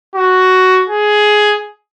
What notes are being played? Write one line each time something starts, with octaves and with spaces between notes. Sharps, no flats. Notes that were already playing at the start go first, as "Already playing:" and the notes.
F#4
G#4